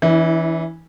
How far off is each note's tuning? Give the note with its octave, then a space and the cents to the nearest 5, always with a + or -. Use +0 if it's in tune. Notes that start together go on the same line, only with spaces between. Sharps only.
E3 +0 C#4 +40 E4 -30